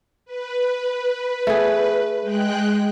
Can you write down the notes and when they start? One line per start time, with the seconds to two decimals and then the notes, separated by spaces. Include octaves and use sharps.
0.25 B4
1.47 A3 G#4
2.22 G#3 G5 F#6